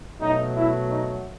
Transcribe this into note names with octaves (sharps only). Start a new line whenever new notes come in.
B2 F#3 A3 D#4
E4
D#4